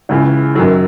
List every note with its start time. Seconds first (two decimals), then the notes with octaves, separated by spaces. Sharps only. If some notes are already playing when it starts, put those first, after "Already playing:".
0.09 C#2 C#3 E3
0.55 F#2 D#3 F#3